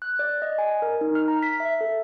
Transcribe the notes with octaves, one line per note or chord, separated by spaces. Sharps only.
F#6
D5
D#5
G#5
A#4
D#4
F6
A#5
B6
E5
A4